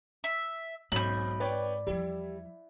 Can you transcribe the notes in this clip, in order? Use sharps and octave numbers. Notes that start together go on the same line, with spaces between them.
E5
B1 G#2 B2 A3 C4 B5 G6
C4 B4 C#5 D5 G5
E2 F3 G3 E4